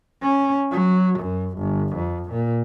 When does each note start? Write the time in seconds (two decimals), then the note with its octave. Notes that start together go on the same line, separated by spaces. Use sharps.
0.23 C#4
0.72 F#3
1.19 F#2
1.58 G1
1.96 F2
2.31 A#2